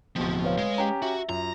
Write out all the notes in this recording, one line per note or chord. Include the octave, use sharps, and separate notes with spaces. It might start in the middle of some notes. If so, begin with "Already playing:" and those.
D1 B2 F3 C4
B4 C#5 F5
G#3
C#4 G4 A#5
F#4 E5
F#2 F4 A#5